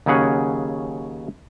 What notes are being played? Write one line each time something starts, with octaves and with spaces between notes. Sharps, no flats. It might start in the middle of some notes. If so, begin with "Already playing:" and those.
D#2 C#3 F#3 C#4 G#4 F#5